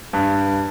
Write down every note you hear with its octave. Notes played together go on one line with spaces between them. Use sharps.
G2